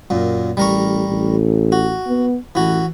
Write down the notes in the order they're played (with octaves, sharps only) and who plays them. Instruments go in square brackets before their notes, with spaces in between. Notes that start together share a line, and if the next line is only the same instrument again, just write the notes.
[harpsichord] F#2 A#2
[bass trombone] A1 [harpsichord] G3 A#4 C#6
[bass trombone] A1
[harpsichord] F#4
[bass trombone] B3
[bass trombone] A1 [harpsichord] E3 F#4